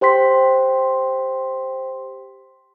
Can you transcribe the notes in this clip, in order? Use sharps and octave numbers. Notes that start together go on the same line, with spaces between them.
G4 C5 G5 C6 B6